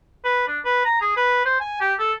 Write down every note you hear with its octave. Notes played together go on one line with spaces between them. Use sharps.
B4
D4
B4
A#5
G#4
B4
C5
G#5
G4
A4